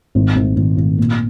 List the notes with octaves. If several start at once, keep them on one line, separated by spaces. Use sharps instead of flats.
G#1
G#1
G#1
G#1
A#2